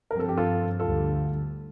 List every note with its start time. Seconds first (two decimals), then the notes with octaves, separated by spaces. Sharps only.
0.11 G2 F3 C4 A#4
0.19 A4
0.29 G4
0.37 F4 A4
0.80 D2 D3 G3 F4 A4